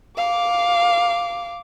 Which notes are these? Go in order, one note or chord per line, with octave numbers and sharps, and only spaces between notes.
F5 D6